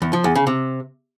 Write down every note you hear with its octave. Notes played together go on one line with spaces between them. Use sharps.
E2
F3
E2
C#3
C3